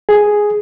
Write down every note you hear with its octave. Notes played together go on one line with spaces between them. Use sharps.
G#4